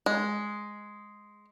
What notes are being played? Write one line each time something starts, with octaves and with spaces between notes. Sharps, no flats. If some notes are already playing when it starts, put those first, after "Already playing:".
G#3